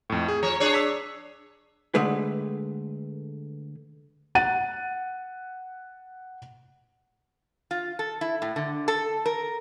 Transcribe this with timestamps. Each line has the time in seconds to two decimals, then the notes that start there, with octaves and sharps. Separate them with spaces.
0.10 F2 A2
0.28 G#4
0.43 F3 C#5 A#5
0.60 D4 G#4 C#5
0.74 E6 B6
1.95 D3 G#3 A3 B4
4.35 F#5 A6 D#7
7.71 F4
7.99 A4
8.21 E4
8.42 A2
8.56 D3
8.88 A4
9.26 A#4